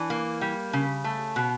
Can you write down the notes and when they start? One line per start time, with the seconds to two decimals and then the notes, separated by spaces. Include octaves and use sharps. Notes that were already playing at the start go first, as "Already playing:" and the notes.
Already playing: E3 D4
0.10 A#3
0.41 G3
0.73 C#3
1.04 A3
1.36 B2